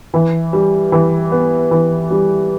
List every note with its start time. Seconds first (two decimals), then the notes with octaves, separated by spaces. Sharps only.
0.14 E3
0.53 G3
0.92 E3
1.32 B3
1.71 E3
2.11 G3